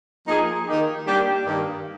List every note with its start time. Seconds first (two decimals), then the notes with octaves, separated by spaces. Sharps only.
0.27 F3 A#3 D#4 G#4
0.66 D#3 A#3 D#4 G4
1.05 G3 A#3 D4 G4
1.45 G2 D#3 A#3